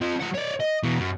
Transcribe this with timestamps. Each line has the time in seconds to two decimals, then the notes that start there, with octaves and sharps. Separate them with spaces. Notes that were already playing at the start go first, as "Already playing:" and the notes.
0.01 C4 F4
0.21 F3 F#5
0.35 C#5 D5
0.60 D#5
0.83 B2 E3
0.99 F#2